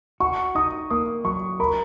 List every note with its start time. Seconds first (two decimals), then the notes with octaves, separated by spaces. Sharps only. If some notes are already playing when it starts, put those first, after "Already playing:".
0.20 F#4 C#6
0.55 D#4 D#6
0.90 A#3 D#6
1.25 F#3 C#6
1.60 A#4 B5